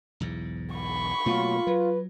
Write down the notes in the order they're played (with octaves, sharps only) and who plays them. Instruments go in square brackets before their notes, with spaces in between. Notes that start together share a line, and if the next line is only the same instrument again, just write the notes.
[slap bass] B1 E2 G#2
[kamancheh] B5 C#6
[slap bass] B2 A3 A#3 [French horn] F#3 [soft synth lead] F4
[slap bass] F#3 [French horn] B4